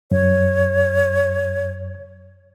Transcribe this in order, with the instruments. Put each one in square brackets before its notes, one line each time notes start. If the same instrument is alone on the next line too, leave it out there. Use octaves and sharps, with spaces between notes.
[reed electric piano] F#2 [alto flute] C#5